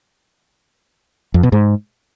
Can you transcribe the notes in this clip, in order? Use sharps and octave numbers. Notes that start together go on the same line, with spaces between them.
F2
B2
G#2